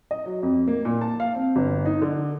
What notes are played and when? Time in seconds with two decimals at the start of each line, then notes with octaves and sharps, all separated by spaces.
0.11 D#5
0.26 F#3
0.43 F2
0.68 A#3
0.85 A#2
1.01 A5
1.20 F5
1.35 C4
1.56 G1
1.86 D#4
2.02 D3